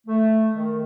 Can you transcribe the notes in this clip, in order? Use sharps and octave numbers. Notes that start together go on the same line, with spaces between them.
A3
D#3